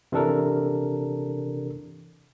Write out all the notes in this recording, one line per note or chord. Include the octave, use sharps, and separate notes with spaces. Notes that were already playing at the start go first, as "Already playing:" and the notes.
C3 E3 D4 A4 A#4